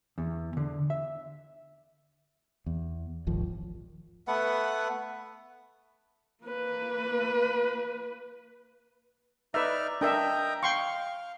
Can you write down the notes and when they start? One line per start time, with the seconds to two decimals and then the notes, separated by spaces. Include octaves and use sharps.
0.18 E2
0.57 D3
0.90 E5
2.66 E2
3.26 D#1 G#1 D#2 F3
4.28 A3 B3 B4 F#5
6.44 A#3 B4
9.54 D#4 B4 D5 E5 F6
10.01 D4 A#4 D#5 E5 G5 A#5
10.63 F5 G5 C6 C#6